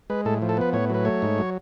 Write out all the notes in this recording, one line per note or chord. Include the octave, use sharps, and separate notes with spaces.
G#3 B4
A2 A4
F3
A4
B3 B4
A2 C#5
F#3 B4
A3 C#5
G#2
F#3